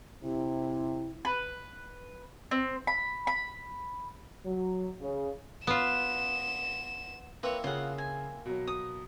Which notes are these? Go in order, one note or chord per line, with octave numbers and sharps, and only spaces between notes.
C3 E4
B4
C4
B5
B5
F#3
C#3
B3 F4 E7
A#3 C4 E4 B4 C#5
C#3 F4 G#4 F#5
G#5
B2 F#3
D#6